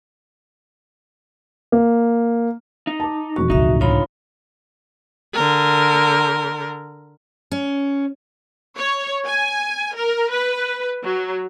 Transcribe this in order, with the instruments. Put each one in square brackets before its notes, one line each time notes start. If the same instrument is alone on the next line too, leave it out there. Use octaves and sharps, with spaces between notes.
[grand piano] A#3
[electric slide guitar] D#4
[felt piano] A5 D6
[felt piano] E1 F2 C#6 [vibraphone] F#4
[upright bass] C#2 A2 [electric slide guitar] D#4 [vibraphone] F#4 E5
[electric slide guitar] D3 D#4 F4 [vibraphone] C#5 B5
[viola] D3 A#4
[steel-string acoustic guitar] C#4
[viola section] C#5
G#5
A#4
B4
F#3